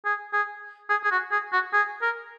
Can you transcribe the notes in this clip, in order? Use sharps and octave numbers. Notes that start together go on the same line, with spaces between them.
G#4
G#4
G#4
G#4
F#4
G#4
F#4
G#4
A#4